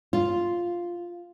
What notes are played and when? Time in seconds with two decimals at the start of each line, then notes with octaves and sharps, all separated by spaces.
0.13 F4